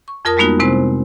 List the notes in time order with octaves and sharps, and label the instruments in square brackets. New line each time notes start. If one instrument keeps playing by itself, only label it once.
[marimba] C#6
F2 F4 A#4 A5 D#6
G3 G#3 A#3 B3 D#4 F#4
C3 G#3 C4 E4 C5